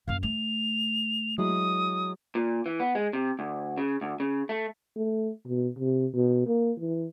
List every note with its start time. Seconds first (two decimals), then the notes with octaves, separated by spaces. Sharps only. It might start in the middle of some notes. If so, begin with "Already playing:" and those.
0.08 F#2 A#3 F5
0.23 A3 F7
1.38 F#3 G#3 E4 D#6
2.35 A#2
2.66 E3
2.80 B3
2.95 G#3
3.13 C3
3.39 D2
3.78 C#3
4.01 D2
4.20 C#3
4.49 A3
4.96 A3
5.48 B2
5.79 C3
6.14 B2
6.47 A#3
6.79 E3